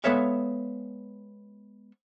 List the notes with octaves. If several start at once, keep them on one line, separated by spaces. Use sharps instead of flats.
G#3 B3 A4 C#5 E5 F5